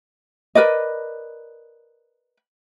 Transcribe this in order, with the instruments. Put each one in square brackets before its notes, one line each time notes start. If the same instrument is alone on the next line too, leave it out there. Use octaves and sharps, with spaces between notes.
[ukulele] A#4 B4 D5 D#5